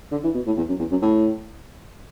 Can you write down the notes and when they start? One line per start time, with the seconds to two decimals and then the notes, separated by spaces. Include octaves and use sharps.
0.12 D3
0.24 E3
0.35 B2
0.46 A2
0.57 E2
0.69 F#2
0.79 E2
0.91 F#2
1.02 A2